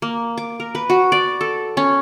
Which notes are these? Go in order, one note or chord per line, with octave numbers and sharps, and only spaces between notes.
A#3
D6
A#4
B4
F#4
D5
A4
C#4